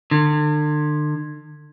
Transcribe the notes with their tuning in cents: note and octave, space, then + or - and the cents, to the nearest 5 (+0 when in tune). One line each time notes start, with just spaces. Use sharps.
D3 +40